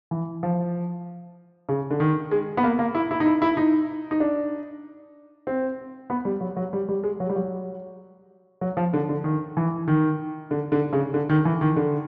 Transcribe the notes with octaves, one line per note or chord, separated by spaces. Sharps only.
E3
F3
C#3
D3
D#3
G#3
B3
A#3
A#3
E4
E4
D#4
E4
E4
D#4
D#4
D4
C4
B3
G3
F#3
F#3
G3
G3
G#3
F#3
G3
F#3
F#3
F3
D3
D3
D#3
E3
D#3
D3
D3
C#3
D3
D#3
E3
D#3
D3